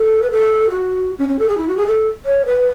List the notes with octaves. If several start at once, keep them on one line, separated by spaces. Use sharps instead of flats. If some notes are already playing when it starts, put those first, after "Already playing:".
Already playing: A4
B4
A4
F#4
C#4
C#4
A4
G#4
E4
F#4
G#4
A4
C#5
B4